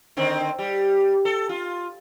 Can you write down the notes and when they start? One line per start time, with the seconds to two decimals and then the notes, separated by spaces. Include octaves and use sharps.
0.17 D3 D#3 C4
0.59 G3
1.25 A4
1.49 F4